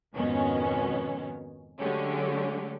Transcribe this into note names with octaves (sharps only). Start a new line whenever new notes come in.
F2 G#2 B2 D#3 B3 C#4
D3 F#3 G#3 A3 C#4 G4